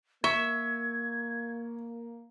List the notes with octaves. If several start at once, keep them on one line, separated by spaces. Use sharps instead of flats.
A#3 E5 C#6 G#6